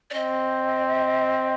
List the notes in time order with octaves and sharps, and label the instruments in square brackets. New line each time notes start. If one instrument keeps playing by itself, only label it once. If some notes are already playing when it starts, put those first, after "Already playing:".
[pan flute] D5
[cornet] C4 [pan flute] D#5